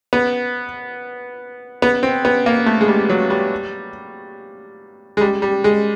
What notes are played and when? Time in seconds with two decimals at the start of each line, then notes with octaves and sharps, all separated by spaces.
0.13 B3
1.82 B3
2.03 C4
2.25 B3
2.46 A#3
2.66 A3
2.81 G#3
2.88 G3
3.09 F#3
3.30 G3
5.17 G#3
5.21 G3
5.42 G3
5.64 G#3